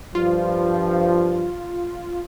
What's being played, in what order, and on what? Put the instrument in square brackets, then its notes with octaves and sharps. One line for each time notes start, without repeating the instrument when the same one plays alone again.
[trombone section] G2 F3 [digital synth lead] F4